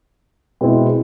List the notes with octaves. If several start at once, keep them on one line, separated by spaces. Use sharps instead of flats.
B2 G#3 C4 E4